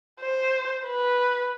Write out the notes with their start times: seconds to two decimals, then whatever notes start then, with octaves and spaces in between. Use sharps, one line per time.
0.21 C5
0.84 B4